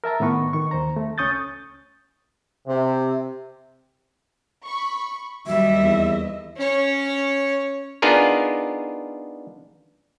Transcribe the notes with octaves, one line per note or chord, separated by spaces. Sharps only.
A#4 E5 A5 A#5
A2 D#3 B3 B4 C#6
D#3 C#6
D#2 C5 A#5
A3
C#2 C#4 C#6 D#6 G6 A6
C3
B5 C#6
D#2 F#3 G3 D#5 E5
E2
C#4 C#5
B3 D4 D#4 F4 G#4 A#4